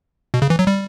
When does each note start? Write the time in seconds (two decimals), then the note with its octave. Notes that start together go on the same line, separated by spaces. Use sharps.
0.34 B2
0.42 C#3
0.50 E3
0.59 F#3
0.67 G3